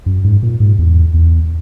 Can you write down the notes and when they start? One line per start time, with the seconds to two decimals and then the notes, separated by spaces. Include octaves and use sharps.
0.06 F#2
0.24 G#2
0.43 A#2
0.60 G#2
0.79 E2
1.14 E2